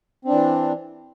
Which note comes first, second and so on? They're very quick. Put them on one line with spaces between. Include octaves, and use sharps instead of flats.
C4 D4 E3